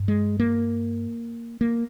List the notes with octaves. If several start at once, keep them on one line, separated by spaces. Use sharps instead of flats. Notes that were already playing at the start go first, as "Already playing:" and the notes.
Already playing: G2
G#3
A#3
A#3